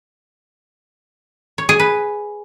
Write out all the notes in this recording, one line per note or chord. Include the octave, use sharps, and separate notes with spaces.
C#5
G#4
B4